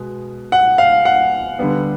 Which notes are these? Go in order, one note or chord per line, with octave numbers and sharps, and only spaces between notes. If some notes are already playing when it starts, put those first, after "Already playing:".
Already playing: B2 G#3 B3
F#5
F5
F#5
D3 G3 B3